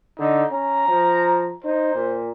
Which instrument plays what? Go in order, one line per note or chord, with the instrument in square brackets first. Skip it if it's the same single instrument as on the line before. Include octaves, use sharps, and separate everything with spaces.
[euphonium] D3 [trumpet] D#4
[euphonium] C#4 [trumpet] A#5
[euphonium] F3
[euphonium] D#4 [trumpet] C5
[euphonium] A#2